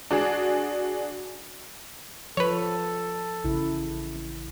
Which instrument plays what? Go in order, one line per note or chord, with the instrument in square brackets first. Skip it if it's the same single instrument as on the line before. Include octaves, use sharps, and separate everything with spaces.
[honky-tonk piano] D4 F#4 G#4
[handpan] F3 [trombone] A4 [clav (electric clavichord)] B4 C#5
[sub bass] A1 [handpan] C#3 E4